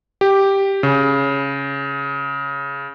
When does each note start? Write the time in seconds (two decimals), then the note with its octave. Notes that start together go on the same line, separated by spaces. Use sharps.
0.21 G4
0.83 C#3